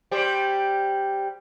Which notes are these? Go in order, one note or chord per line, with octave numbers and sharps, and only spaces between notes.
G3 G4 C5